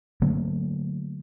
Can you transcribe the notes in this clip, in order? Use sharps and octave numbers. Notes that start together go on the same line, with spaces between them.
D3 F#3 A3 A#3